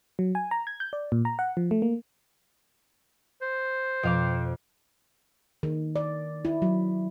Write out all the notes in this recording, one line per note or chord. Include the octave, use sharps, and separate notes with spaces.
F#3
G#5
A#5
G#6
G6
D5
A#2
A#5
F#5
F3
A3
A#3
C5
F2 B2 F5 D6
D#3
D5
E4
F#3